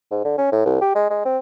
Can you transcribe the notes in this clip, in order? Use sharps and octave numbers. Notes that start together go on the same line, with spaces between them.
G#2
D3
C#4
A2
C2
G4
G#3
G#3
C4